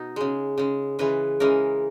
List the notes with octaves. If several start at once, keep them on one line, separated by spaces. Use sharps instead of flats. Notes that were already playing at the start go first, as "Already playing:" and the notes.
Already playing: B2 D#4
C#3 G#3
C#3 G#3
C#3 E3 G#3 B4
C#3 E3 G#3 A#4